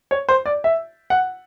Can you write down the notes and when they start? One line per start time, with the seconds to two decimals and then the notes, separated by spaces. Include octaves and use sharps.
0.11 C#5
0.29 C5
0.46 D5
0.64 E5
1.10 F#5